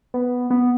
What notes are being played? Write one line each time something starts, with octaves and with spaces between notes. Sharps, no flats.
B3
B3